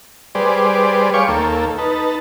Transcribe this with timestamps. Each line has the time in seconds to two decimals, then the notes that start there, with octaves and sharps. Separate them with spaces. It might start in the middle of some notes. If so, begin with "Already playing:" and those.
0.35 G3 G#4 B4 C5 D5
1.14 C#5 F5 G5 G#5 C#6 D6
1.28 D#2 A#3 A4
1.78 D#4 B4 A5